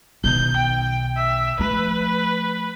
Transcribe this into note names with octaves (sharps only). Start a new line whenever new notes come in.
B1 D#3 G6
G5
E5
F3 A3 B4